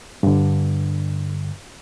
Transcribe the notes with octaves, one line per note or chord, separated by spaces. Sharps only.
G2 D3